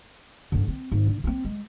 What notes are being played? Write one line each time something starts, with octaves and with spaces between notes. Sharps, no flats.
G2 D3
C4
G#1
D3
A#3 C4
G#3